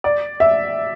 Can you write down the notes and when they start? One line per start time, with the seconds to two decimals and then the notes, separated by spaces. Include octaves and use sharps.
0.04 D5
0.40 E5